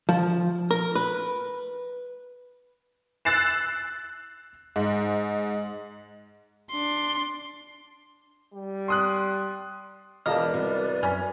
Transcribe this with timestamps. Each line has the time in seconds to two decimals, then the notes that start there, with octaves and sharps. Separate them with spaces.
0.09 F3
0.71 A#4
0.95 B4
3.25 E6 F#6 A6 C7 E7
4.76 G#2
6.70 D4 C6
8.54 G3
8.88 C6 D#6 F#6
10.26 E1 F4 B4 D5 D#5 A5 F6
10.54 C2 F#4
11.03 F#2 C#4 B5